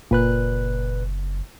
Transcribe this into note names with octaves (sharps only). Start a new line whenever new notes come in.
F#1 A#2 B4 F#6